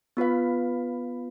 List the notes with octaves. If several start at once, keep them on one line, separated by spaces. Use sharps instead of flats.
B3 F4 B4 F5